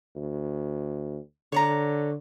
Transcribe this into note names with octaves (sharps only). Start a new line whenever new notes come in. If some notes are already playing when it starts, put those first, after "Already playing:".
D2
D3 C#5 D5 A#5